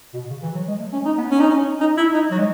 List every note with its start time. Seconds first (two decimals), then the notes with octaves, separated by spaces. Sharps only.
0.14 B2
0.30 C#3
0.43 E3
0.55 F#3
0.68 G#3
0.80 A3
0.93 C#4
1.05 D#4
1.18 B3
1.30 C#4
1.40 D#4
1.50 C#4
1.80 D#4
1.97 E4
2.14 D#4
2.31 F#3
2.38 G#3